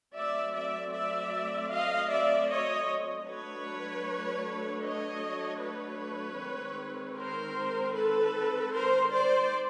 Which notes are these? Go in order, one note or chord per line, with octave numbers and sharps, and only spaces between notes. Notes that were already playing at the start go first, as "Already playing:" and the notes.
F#3 A3 C4 D5 E5
D5 E5
D5 E5
D#5 F5
D5 E5
C#5 D#5
F#3 A3 D4 B4 C#5
C#5 D#5
B4 C#5
D#3 G#3 C4
A#4 C5
A4 B4
A#4 C5
C5 D5